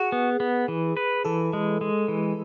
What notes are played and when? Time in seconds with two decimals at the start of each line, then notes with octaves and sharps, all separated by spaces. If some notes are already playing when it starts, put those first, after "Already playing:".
Already playing: F#4 G#4
0.12 B3
0.40 B3
0.68 E3
0.97 B4
1.25 E3 A4
1.53 G#3
1.81 G#3
2.08 E3